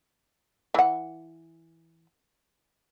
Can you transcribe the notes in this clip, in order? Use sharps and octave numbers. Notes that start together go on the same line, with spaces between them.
E3 F#5